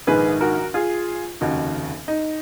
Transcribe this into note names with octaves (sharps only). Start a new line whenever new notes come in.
A#1 G#2 D#3 G#4 B4
F#4 A#4
F4 G#4
F1 D#2 C#3 D#4 F#4
D#4